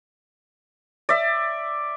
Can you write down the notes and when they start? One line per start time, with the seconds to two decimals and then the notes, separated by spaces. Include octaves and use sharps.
1.09 D5 E5